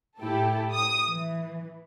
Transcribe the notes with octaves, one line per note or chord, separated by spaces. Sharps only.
A2 E4 G4 A4
D#6
E3